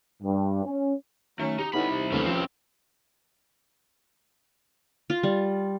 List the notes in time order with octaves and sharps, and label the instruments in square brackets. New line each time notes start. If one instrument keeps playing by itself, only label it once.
[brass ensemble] G2
C#4
[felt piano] D#3 [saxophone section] F#3 C#4 [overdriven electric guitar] A3
[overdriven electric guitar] D#4 [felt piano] G4
[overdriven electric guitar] C2 B5 [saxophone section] D3 B3 C#4 [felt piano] D#4 E4 G4
[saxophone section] E2 C3
[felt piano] D#2 A3 [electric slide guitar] C#4 F4 B4
[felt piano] F3 [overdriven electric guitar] C4
[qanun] F4
G3